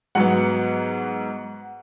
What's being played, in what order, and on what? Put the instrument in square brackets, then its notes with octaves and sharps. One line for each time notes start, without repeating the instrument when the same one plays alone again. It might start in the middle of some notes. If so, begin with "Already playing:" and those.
[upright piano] G#2 F#3 B3 F#5